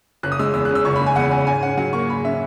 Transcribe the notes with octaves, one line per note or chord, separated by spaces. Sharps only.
F#1 F#6
D#6
G#3 E6
E2 E6
C#3 F#6
E6
F#1 C#6
G#3 B5
G#5
E2 F#5
C#3 G#5
G#2 G#5
C#4 F#5
F#3 F#5
A#3 C#6
G#2 B5
C#4 E5